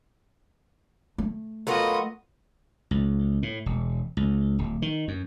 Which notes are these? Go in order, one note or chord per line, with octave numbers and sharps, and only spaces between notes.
A3
F#3 B3 F4 F#4 A4 A#4 D#5
C#2
A2
E1
C#2
D1
D#3
F#2